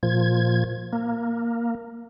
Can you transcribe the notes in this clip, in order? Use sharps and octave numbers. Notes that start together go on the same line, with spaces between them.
A#2 F3 G#6
A#3